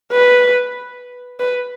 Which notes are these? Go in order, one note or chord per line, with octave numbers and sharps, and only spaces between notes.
B4
B4